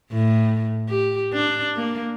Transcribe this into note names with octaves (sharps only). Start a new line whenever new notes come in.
A2
G4
D4
A#3